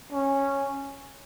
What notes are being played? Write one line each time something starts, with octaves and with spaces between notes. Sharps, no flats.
C#4